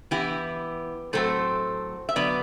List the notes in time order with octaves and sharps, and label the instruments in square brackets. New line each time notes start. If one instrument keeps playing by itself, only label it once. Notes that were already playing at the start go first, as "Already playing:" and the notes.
[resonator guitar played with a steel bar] E3 B3 E4 G4
A2 F#3 A3 C4 A4 C5
E5
D3 F#3 B3 B4 D5